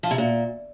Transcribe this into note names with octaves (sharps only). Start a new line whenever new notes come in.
F3
C3
A#2